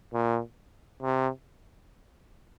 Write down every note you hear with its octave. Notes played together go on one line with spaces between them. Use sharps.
A#2
C3